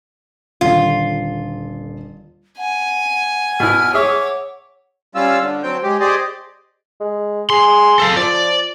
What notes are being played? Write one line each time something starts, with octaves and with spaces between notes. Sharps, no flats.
D#1 D3 F4
F#5 G#5
B2 E4 F6
G#4 C#5 E5 C#6 D6
G3 C#4 F4 F5 E6
D3
F#3 C4 G5
G#3 G4
G4 G#4 C5 D5 D#5
G#3
G#4 C6
A4 F5
F3 D5